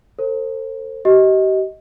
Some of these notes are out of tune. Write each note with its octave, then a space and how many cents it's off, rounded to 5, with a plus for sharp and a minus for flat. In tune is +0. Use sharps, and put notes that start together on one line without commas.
A4 +45 C5 +25
G4 -40 D#5 +20